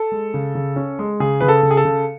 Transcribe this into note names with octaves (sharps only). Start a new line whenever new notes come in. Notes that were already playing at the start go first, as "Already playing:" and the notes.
Already playing: A4
G#3
C#3
C#3
C#4
G#3
C#3 G#4
C#3 B4
A4
C#3
G#4
A4
C#3